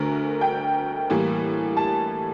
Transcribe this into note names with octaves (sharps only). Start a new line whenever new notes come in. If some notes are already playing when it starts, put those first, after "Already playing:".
Already playing: D2 D3 A3 A#4
G5
A2 E3 G3 A#3
A5